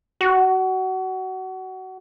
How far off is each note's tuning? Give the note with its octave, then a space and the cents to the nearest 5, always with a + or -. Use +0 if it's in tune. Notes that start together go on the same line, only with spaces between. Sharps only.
F#4 +25